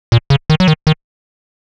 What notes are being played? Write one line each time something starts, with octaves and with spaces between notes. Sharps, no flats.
A#2
C#3
D#3
F#3
D#3
D#3